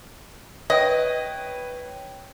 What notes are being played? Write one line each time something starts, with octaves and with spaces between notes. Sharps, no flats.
B4 C#5 D#5 G5